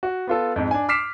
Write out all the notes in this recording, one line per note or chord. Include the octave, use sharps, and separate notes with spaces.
F#4
B3 F4 A4
F2 G#2
D4 G#5
D6 F6 B6 C7 E7